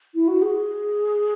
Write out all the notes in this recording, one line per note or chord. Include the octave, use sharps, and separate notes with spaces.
E4
F#4
G#4